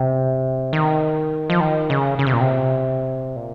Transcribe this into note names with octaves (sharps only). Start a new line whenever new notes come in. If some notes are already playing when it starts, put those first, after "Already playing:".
Already playing: C3
D#3
F3
D#3
C#3
C#3
C3
A#2
C3
A#2